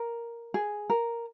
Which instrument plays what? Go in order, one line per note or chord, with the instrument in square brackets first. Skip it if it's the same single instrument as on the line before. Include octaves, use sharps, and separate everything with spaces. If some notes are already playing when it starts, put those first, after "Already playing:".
Already playing: [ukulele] A#4
G#4
A#4